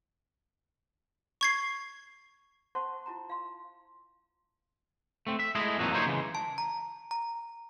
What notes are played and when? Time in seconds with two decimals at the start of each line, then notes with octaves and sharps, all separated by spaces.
1.41 C#6 G#6 C7
2.75 C5 F#5 A5 C6 C#6
3.06 E4 F4 A5 A#5
3.30 F5 C6
5.27 A3 C4
5.40 E5
5.55 G#3 A3 E4 G#4 D#5
5.78 F2 A#2 E3 F#3 A3 D#4
5.91 F#3 A#3 D#4 C5 C#5
6.06 C#3 E3 G#3
6.35 A5
6.58 A#5
7.11 A#5